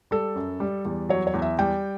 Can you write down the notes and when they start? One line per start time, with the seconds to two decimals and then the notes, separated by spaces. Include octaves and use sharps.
0.11 G3 A4
0.36 F#2
0.60 G3
0.85 E2
1.09 F#3 C#5
1.27 C#5
1.34 E2
1.42 E5
1.59 G3 G5